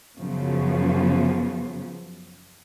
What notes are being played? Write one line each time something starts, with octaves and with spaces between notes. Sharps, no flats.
F#2 C#3 F3 F#3 B3